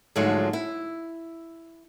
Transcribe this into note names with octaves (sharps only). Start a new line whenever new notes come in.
G#2 D3 F3 F#3 G#3 A3
E4